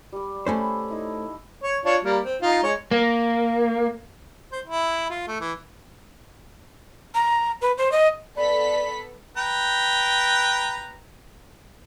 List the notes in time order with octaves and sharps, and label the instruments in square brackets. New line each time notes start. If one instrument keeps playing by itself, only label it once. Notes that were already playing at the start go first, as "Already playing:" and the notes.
[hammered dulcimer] G3 D5
[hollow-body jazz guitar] A3 C#4 C5 [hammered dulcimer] A4 B5 C6
[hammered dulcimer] D#4 E4
[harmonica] C#5
D4 F4 C#5
G3 A#3
C4
D#4 F4
G#3 C#5
[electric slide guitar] A#3
[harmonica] C5
E4
F4
A3
E3
[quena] A#5
B4
C5
D#5
[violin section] B3 A4 B6 [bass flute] D5 [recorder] B5
[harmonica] B4 G5 A#5